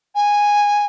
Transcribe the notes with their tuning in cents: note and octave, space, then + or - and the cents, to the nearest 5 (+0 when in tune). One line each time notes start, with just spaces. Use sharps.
G#5 -10